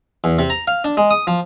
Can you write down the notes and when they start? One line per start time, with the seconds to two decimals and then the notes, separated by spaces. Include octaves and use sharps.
0.24 E2
0.39 C3
0.50 A#5
0.68 F5
0.84 D4
0.97 G#3
1.11 D#6
1.27 F3